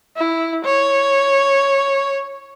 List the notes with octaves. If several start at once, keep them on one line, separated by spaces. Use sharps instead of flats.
E4
C#5